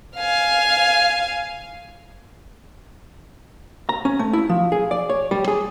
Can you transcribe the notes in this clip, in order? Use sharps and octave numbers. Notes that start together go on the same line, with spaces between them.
F5 G#5
A#5
C#4
A3
E4
F3
G#4
D5
C#5
G3
G#4